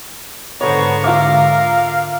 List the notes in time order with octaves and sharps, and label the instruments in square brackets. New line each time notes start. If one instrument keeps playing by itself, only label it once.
[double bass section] G#2 D3 [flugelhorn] B3 [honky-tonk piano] A4 C#5 [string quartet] C5 A#5 C#6
[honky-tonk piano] F4 E5 D6 [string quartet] A#4 [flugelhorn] F5